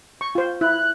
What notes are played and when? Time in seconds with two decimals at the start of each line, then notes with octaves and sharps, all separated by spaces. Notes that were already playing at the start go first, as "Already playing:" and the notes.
0.21 C#6
0.35 F4 C5
0.61 E4 F#6